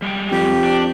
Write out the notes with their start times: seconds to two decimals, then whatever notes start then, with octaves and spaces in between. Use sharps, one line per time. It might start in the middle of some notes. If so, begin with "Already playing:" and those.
0.02 G3 G#3 G5
0.31 F2 G4
0.64 D4